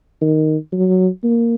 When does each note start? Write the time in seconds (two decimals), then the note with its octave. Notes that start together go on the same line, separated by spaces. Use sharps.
0.21 D#3
0.73 F#3
1.24 A#3